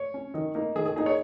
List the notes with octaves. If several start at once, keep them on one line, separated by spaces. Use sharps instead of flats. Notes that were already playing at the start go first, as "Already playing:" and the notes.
Already playing: C#5
C#4
D#3
A#3 D#4
D#3 G#4
G#4
A#3 D#4 G#4
C#5